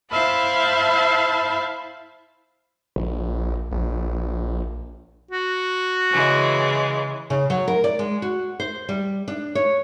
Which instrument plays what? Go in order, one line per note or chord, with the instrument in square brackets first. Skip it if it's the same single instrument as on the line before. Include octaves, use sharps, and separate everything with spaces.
[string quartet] E4 C5 E5 F5 A5 B5
[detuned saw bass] A#1
A#1
[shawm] F#4
[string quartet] C#3 E3 G#3
[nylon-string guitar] C#3
F#3
A#4
D5
G#3
F#4
C5
G3
D4
C#5